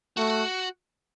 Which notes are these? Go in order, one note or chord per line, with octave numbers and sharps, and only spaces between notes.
A3 F#4